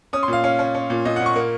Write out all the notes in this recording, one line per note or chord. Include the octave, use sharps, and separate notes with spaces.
C#4 D#6
C6
A#2 F5
C#4 F5
C#4
C#4
A#2
A#2 D#5
F#5
A#2
C#6
A#3